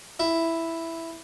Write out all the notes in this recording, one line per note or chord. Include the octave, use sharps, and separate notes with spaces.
E4